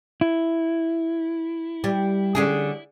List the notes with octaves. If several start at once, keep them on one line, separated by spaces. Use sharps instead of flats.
E4
G3
D3 C#4 G#4